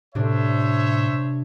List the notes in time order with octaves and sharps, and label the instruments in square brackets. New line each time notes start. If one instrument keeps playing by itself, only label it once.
[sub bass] A2 [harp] C3 D4 [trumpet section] C5 C#5 E5